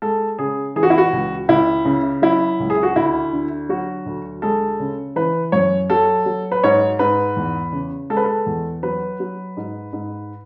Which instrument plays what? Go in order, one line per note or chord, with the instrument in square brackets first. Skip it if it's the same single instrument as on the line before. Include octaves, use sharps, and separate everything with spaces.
[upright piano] G#3 A4
C#3 G#4
E3 G#4
F#4
E4
F#4
C#2
C#2 E4
C#3
F#3 E4
C#2
G#4
F#4
D2 E4
D3
F#3 F#4
D2
G#3 A4
C#3
E3 B4
F#2 C#5
F#3 A4
F#3
B4
G#2 C#5
G#2 B4
E2
C#3
G#3 A4
B4
A4
E2
F#3 B4
F#3
G#2
G#2